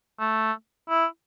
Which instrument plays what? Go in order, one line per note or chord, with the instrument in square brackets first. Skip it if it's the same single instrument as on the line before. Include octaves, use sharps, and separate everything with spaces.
[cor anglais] A3
E4